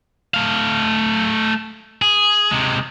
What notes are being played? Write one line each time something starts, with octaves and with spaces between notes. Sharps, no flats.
A3 F5
G#4
C3 G#3